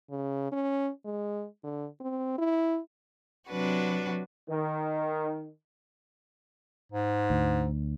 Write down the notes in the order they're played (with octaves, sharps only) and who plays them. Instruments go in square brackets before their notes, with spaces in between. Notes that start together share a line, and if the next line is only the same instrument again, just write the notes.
[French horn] C#3
C#4
G#3
D3
C4
E4
[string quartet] C3 F#3 D4 F#4 B4
[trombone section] D#3
[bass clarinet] G#2
[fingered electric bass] D2